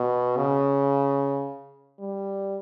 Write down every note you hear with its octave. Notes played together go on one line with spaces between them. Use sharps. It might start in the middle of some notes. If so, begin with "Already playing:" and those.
Already playing: B2
C#3
G3